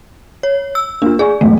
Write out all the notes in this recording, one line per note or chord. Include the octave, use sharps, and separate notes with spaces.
C#5
E6
A#3 D4 F4
G#4 D5 G#5 C#6
E1 B1 G#2 A3